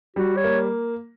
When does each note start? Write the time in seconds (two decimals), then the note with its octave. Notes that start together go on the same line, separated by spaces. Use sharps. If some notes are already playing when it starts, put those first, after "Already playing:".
0.16 G3 F#4
0.37 C#5
0.44 A#3